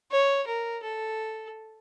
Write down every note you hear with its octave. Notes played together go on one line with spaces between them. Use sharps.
C#5
A#4
A4